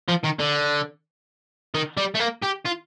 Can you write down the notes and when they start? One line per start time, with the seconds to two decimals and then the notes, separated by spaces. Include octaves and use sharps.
0.08 F3
0.24 D#3
0.39 D3
1.75 D#3
1.97 G3
2.14 A3
2.20 A#3
2.42 G4
2.65 F4